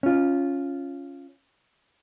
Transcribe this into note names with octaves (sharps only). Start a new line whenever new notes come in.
C#4 F4